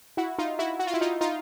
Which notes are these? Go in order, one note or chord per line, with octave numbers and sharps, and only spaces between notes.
E4 F#4
D#4 F4
E4 F#4
F#4
F4
E4
D#4 F4
D#4 F4